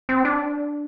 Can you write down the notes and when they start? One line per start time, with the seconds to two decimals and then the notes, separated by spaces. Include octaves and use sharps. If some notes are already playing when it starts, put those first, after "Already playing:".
0.09 C4
0.25 D4